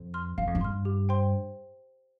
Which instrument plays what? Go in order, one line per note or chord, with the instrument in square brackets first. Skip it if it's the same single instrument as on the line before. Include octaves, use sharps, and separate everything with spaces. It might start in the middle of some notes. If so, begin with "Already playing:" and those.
Already playing: [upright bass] F2
[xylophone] C6 F6
[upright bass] G2 [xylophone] F5
[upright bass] F2
G2
[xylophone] C6 F6
G4
C5 G5 C6